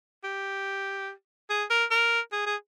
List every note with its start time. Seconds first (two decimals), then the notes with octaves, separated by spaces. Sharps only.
0.24 G4
1.50 G#4
1.70 A#4
1.91 A#4
2.32 G#4
2.46 G#4